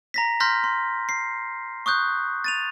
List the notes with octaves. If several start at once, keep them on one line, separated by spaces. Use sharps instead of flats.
A#5 A#6 B6
C6 F6 G6 A#6 B6
C6
C7
C#6 D#6 F#6 G6
A6 D#7 F7